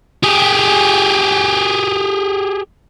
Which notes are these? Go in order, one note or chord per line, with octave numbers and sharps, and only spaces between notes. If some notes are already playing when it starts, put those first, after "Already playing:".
G4 G#4